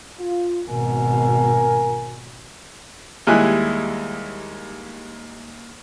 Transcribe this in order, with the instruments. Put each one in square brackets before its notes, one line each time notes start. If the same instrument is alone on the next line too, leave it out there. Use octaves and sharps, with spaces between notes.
[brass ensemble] F4
[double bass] G#1 B2 [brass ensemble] A#4 G#5
[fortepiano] D#2 G3 G#3 E4 G#5 F#6